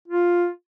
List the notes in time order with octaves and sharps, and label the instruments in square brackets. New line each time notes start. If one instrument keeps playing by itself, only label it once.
[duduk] F4